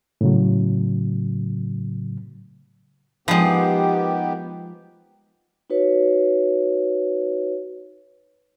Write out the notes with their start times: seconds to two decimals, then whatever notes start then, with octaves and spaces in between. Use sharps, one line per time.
0.21 A2 C#3 F#3
3.28 D#3 F3 G#3 B3 G4
5.70 D#4 F#4 B4 C#5